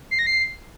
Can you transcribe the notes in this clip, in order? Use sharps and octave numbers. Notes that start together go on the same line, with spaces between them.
C7
A#6
C7